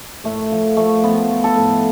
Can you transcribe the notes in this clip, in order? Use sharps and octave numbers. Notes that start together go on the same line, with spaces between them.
A2 A3
F3
F3 A3
F3 B3
F3
A4
A2